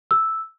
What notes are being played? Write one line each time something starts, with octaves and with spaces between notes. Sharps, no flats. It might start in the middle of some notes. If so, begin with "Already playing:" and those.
E6